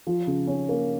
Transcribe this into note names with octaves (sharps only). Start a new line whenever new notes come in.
F3
C#3
C#4
A#3